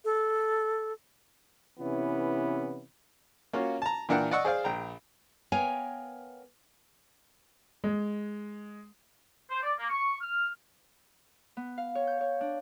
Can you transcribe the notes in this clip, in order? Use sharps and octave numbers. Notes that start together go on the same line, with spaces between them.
A4
C3 E3 B3 C#4 E4
A#3 C#4 F4 F#4
A5 A#5
A#2 E3 D4 A#4 F#5 G5
D5 D#5 F#5 C#6 E6
G#4 C5 D5 F5
A#1 G5 A#5
B3 A#4 C#5 F5 G5 G#5
G#3
C5
D5
A#3
C#6
F6
B3
F5
C#5
G6
C#5
D4